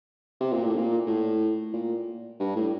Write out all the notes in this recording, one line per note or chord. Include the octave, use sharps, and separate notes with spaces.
C3
A#2
A2
A#2
A2
A#2
G2
A2